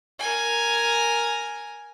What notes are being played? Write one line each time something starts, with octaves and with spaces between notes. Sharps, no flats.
A#4 G#5